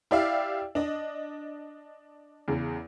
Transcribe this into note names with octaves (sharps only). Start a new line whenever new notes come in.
E4 G4 D5 E5 F5
D4 D#5
E2 C#3